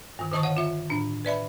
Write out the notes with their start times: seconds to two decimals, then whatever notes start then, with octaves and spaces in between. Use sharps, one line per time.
0.19 G2 D#3
0.32 D3 D#3 D#5 A5 C#6 D#6
0.43 C#5 F5 F#5
0.57 F4 E5
0.90 A2 D4
1.25 B4 D5 E5 B5